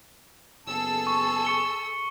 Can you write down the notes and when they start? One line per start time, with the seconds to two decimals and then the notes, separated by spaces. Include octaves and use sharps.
0.67 F#1 B3 G#4 A4 A5 E6
1.07 C#6
1.45 C#6 C#7 G7